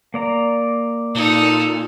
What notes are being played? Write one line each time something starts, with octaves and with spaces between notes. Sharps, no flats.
A#3 D5 A#5
A#2 D#4 A4